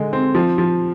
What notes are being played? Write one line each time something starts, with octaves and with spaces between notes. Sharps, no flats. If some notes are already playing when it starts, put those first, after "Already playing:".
Already playing: D3 G#3
C4
F3
F3